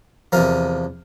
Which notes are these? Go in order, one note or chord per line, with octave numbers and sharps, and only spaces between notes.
E2 C3 F3 A#4